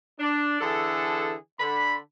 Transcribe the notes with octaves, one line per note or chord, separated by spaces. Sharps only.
D4
D3 E3 G#4 A4
D3 B5